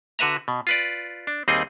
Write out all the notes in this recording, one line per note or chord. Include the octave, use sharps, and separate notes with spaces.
D3 F#4 B4 E5 A#5
B2
F4 B4 D5
D4
D#2 G3 C4 D#4 G#4 D#5